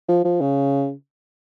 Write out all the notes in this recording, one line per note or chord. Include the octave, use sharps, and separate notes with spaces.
F3
F3
C#3